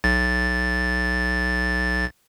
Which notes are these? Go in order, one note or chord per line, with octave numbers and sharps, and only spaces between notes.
B1 A6